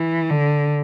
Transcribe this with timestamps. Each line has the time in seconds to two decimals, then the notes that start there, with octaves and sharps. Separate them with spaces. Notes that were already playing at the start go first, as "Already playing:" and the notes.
Already playing: E3
0.30 D3